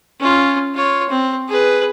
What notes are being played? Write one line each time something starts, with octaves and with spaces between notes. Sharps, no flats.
C#4 F4
F4 C#5
C4
G#4 B4